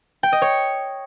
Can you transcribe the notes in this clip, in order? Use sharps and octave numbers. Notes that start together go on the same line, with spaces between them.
G5
D#5
C#5